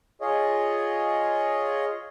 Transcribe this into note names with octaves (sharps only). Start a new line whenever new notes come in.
F4 G#4 C#5 D#5